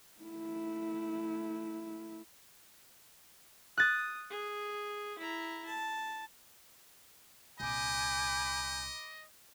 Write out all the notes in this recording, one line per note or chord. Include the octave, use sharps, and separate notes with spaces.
A3 E4
D#6 F#6 A6
G#4
E4 A#5
A5
C2 A#2 D#5 G#5 B5 D6 G6